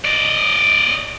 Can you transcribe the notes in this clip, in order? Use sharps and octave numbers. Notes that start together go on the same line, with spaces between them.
D5 D#5